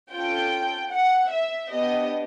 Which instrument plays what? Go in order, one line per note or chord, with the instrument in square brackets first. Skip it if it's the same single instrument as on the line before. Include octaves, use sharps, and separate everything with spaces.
[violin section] C#4 F4 A4 G5
F#5
E5
B3 D4 G4 D#5